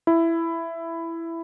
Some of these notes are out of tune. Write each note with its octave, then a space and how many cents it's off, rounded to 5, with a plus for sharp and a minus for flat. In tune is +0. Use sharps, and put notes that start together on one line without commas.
E4 +10